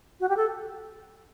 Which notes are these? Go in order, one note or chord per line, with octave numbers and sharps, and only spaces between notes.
F#4
G4
A4